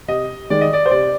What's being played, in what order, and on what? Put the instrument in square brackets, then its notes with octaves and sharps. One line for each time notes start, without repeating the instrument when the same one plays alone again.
[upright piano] C3 D#5
D#3 G#3 D5
D#5
D5
C5
C3 D5